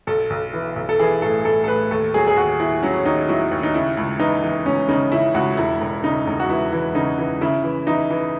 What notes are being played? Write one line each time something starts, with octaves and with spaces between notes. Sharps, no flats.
B1 A4
B1
E3
B1
A4
E3 G#4
A2 A4
A2 A4
A4
A2 B4
D#2 A4
F#3 G#4
G#4
D#2 F#4
D#2 E4
F#3 C#4
D#2 D#4
F#3 E4
D#2
D#4
C#3 E4
C#2
E3 D#4
E3
C#2 C#4
C#3 D#4
C#3 E4
C#2 F#4
E1 E4
E1
C#3 D#4
E1
F#4
E3 E4
E3
C#3 D#4
E3
C#3 E4
E3
E3 D#4
E3